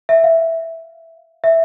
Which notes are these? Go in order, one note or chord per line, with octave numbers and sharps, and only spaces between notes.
E5
F5
E5